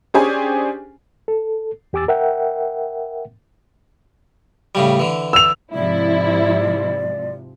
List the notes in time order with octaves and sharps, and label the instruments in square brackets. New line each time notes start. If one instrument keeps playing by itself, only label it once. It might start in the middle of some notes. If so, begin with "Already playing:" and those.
[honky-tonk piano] C#4 D4 G4 G#4 C5 G#5
[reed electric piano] A4
E2 G4 G#5 D6 E6 A6
A#4 E5 F#5 G5
[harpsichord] A2 C#3 G3
D3 E3
[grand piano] E6 F7
[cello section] G#2 C3 F3 [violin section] E4 [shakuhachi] D5